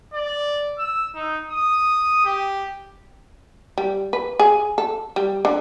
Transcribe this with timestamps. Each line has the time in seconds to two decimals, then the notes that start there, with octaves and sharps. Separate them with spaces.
0.14 D5
0.78 E6
1.15 D#4
1.50 D#6
2.25 G4
3.78 G3
4.13 B4
4.39 G#4
4.78 A4
5.16 G3
5.45 D3